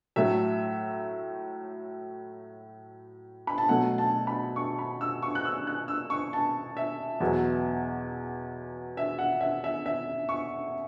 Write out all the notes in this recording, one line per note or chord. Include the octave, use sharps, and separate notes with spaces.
A2 F#3 A3 E5
B5
A5
B2 F#3 A3 F#5
A5
B5
C#6
B5
E6
C#6
F#6
E6
F#6
E6
C#6
A5
E5
E2 B2 F#3 B3
E5
F#5
E5
E5
E5
C#6